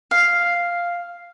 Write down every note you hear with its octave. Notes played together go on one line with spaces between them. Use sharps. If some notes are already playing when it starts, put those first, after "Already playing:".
F5